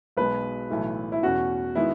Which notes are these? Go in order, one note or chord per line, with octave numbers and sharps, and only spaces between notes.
B1 B2 G#3 B4
B1 A2 E3 A3 E4
E4
E2 B2 A3 C#4 F#4
D#3 G#3 B3 E4